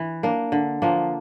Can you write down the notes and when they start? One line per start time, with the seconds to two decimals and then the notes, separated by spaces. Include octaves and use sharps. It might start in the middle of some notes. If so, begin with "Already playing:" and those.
Already playing: E3
0.23 A#3 D4
0.52 D3
0.82 F3 A#3 D4